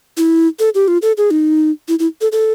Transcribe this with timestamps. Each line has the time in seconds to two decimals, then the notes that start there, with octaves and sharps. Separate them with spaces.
0.17 E4
0.59 A4
0.75 G4
0.88 F4
1.02 A4
1.17 G#4
1.31 D#4
1.89 E4
1.99 E4
2.21 A4
2.32 A4